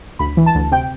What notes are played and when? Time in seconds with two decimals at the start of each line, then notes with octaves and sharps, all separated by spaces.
0.19 D2 B5
0.37 E3
0.46 A5
0.55 D2
0.71 C3 G5